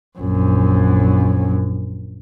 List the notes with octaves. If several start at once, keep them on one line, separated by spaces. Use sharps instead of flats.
A#1 F#2